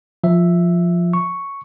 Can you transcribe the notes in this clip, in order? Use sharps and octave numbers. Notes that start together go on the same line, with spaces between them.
F3 E5
C#6